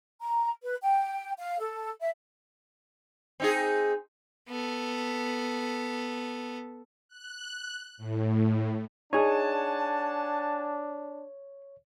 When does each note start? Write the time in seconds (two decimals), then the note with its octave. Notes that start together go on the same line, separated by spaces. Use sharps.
0.21 A#5
0.62 B4
0.82 G5
1.38 F5
1.58 A4
2.00 E5
3.40 C4 D#4 G#4
4.49 B3 A4
7.08 F#6
7.97 A2
9.13 D4 D#4 G#4 C#5 F#5 G#5 A5